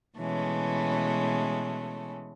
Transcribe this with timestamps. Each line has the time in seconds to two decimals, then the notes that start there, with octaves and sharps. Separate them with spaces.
0.18 B2 E3 G#3 A3 C#4